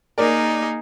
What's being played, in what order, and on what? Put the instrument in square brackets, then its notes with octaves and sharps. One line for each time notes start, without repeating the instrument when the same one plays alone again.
[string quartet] A#3 D#4 G#4 [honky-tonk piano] A#4 D5